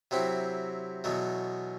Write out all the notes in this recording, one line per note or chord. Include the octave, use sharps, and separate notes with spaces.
C3 F#3 C4 E4
E2 B2 F#3 A3